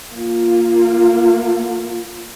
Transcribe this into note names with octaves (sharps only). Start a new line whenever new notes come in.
A#3 F4